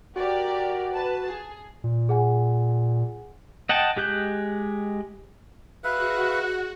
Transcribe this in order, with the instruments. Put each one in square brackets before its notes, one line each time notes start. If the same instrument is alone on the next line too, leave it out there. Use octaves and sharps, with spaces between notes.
[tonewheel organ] F#4 [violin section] G4 A#4 D5
[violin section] B4 A5
G#4
[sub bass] A#2
[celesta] G#4 F#5 G#5
[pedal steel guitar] D#5 F#5 G5 A5
G#3 G4 F#6 G6
[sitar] G#3 [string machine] F#4 [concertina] B4 E5 F5 [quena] F#6